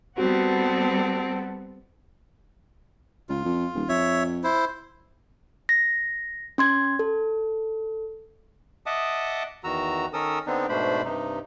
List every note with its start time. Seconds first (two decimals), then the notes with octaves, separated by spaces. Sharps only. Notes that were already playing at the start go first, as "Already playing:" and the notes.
0.18 G3 B3 C4 F#4 A4 F#5
3.29 C#2 F4
3.45 F2
3.75 D#1
3.89 F2 C#5 E5
4.44 E4 C5
5.69 A#6
6.58 C#4 C6 G#6
6.99 A4
8.86 D#5 E5 F#5 A5 D6 D#6
9.64 E2 D#3 F#4 A#5 E6
10.13 D#3 C#4 A4 A#4 D#6 E6
10.46 D3 B3 C4 D4 D#4
10.69 G#2 B2 A3 D4 C5 B5
11.04 G2 C3 D#4